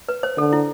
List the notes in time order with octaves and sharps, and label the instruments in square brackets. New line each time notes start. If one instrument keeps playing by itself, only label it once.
[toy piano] B4
C5
[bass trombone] D3 [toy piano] A4
[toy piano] E4